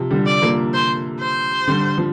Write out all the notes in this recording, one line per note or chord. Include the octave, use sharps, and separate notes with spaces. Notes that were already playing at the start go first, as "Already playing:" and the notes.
Already playing: C3 F3
D3 G3
D5
F3 A#3
C5
C5
D3 G3
F3